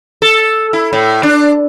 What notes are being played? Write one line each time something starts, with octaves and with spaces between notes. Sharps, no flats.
A4
E4
A2
D4